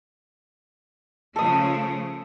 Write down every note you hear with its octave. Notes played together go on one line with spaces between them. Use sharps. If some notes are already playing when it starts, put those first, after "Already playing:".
C#3 F3 A3 A4 D#6